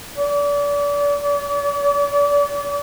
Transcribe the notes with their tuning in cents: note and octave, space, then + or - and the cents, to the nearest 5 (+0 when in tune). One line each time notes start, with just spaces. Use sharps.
D5 -35